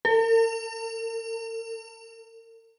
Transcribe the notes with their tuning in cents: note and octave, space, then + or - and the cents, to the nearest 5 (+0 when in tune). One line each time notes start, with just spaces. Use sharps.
A#4 -45